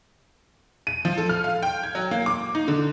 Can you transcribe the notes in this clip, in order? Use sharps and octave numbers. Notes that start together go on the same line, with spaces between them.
D#7
F3
A4
F6
F5
G5
G#6
F#3
A#3
D6
D#4
D3